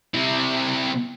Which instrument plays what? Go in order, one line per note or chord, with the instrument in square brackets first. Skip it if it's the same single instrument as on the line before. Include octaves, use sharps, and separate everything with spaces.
[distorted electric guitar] C3 E4